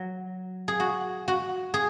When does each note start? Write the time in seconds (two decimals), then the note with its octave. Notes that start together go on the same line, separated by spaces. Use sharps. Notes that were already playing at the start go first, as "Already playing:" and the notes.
Already playing: F#3
0.68 G#4
0.80 F#4
1.28 F#4
1.74 G#4